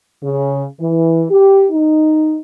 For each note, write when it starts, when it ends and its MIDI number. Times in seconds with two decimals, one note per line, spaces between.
0.23 0.65 49
0.80 1.25 52
1.30 1.65 67
1.70 2.39 63